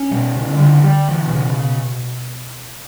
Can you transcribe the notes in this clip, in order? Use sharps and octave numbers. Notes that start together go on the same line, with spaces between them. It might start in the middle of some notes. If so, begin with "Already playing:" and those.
Already playing: C#4
B2 G3
C#3
D3
G3
G3
E3
B2
C#3